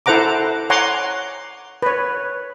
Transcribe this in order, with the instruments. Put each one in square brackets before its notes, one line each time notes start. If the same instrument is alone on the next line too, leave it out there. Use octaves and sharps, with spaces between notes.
[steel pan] E4 A4 C5 F#5 A#5 D6
C#5 F#5 G#5 A#5 C6 D6
B4 C#5